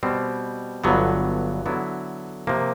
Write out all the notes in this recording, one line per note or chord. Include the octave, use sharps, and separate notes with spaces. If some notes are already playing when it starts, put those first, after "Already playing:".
B2 G3 C4
G1 G2 D3 F#3 B3
D3 F#3 B3 E4
C3 F3 A#3